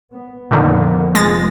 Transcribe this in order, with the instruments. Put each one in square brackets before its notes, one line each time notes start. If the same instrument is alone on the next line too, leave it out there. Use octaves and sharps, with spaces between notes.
[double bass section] B3
[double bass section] F2 A#3 B3 [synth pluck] A#2 D3 D#3
[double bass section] F1 F3 [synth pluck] G#3 A6 A#6